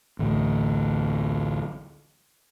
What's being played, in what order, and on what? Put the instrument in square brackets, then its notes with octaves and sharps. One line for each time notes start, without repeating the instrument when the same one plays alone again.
[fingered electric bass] A1 D2 D3